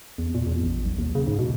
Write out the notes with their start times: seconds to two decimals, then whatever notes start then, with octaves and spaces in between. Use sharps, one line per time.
0.18 E2
0.34 A#2
0.47 E2
0.64 A1
0.86 B1
0.99 D#2
1.15 C#3
1.27 G#2
1.39 B2